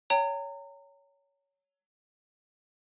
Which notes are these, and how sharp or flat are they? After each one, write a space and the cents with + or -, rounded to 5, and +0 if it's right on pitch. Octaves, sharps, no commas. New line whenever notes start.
C#5 +15 G5 +20 A#5 -30